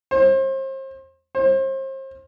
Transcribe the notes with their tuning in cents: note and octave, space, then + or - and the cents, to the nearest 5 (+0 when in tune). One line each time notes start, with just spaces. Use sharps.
C5 +35
C5 +35